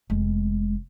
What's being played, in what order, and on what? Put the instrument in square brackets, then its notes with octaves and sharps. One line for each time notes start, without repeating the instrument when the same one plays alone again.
[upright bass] F1 G#3